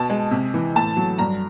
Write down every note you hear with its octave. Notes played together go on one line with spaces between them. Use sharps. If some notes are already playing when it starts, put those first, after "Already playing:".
Already playing: B2 A5
G#3
C3
E3
A2 A5
F#3
G2 A#5